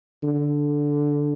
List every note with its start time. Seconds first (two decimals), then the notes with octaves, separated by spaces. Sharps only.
0.24 D3